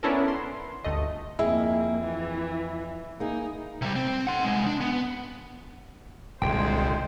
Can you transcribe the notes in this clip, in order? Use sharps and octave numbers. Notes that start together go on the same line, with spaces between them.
B3 C#4 D4 E4 A4 A#4
C6
G1 D2 A3 D#5
F2 A#3 E4 G#4 D#5
E3
A#3 D#4 G#4
C3 G3
C4
F#5 C6
C2 G#3
D4
B3
D#1 C2 D3 G#3 C5 G5